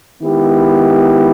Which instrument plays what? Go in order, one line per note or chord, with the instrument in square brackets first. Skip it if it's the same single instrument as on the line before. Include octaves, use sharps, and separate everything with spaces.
[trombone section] D#3 G#3 B3 E4 G4